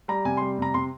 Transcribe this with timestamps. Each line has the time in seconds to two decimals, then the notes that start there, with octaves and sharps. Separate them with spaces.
0.08 G3 A#5
0.25 C3 G#5
0.37 G3 C6
0.59 C3 A#5
0.74 C3 C6